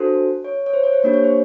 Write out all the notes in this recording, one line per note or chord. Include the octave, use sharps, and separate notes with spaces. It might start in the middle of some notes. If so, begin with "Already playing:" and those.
Already playing: D4 F#4 A4 C5
C#5
C#5
C5
C#5
C5
A#3 D4 G4 C#5
C#5
C5